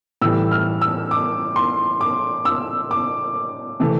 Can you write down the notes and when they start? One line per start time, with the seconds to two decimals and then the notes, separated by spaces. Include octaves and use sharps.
0.21 A2 E3 G3 E6
0.51 F6
0.81 E6
1.11 D6
1.56 C6
2.01 D6
2.45 E6
2.91 D6
3.80 C3 E3 A3